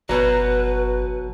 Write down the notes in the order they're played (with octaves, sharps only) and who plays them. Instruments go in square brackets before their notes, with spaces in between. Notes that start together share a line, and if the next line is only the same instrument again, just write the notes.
[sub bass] G1 [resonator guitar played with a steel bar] B2 F#3 [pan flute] B4